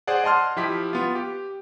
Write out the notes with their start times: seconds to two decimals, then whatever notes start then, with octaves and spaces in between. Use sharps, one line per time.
0.07 G#4 C5 D5 F#5
0.23 D#5 F#5 A5 C6 F6
0.56 F3 E4 G4 B6
0.93 B3 F4
1.15 G4